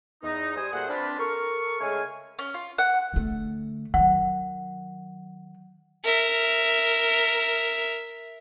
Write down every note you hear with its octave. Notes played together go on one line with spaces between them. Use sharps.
E2 D#4
G3 C5 G#5 D#6
A#2 G3 A3 G#4 C5 F#5
C4 D4 F4 B4
A4 A#4 C#6
C#3 G#3 A3 C#4 F5 G#5
C#4
F4
F#5
D3 A3
D#3 F#3 F#5
A#4 E5